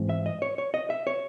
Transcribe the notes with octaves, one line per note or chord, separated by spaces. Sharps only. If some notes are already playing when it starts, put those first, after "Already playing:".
Already playing: G#2 E3 C4
E5
D#5
C#5
C#5
D#5
E5
C#5